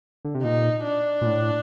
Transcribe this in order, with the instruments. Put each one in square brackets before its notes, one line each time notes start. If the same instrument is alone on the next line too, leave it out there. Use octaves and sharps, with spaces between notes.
[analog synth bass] D3
C3
[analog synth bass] A#2 [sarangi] D#4
[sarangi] D4
[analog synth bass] A#2
A2